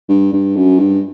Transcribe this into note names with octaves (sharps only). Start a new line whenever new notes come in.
G2
G2
F#2
G2